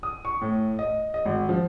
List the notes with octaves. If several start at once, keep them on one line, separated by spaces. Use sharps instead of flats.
D#6
C#6
A2
D#5
D#5
G#1
F3